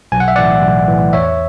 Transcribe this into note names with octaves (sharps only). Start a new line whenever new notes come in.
B1 G#5
F#5
E5
A2 E3 D5 F#5
B1
A2 E3
E2 C#5 E5